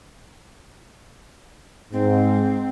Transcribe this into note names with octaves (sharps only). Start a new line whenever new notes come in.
G#2 C4